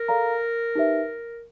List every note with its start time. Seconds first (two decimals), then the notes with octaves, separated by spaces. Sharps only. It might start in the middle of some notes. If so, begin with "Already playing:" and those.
Already playing: A#4
0.08 A4 D5 F5 A#5
0.75 D#4 G4 B4 E5